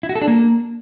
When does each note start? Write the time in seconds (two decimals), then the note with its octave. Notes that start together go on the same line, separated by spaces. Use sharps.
0.03 E4
0.09 F#4
0.15 A4
0.22 D4
0.28 A#3